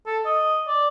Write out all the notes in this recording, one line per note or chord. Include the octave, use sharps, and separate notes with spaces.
A4
D#5
D5